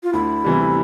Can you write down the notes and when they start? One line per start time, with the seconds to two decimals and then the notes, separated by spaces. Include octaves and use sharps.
0.03 F4
0.13 D2 E4
0.44 C3 E3 G3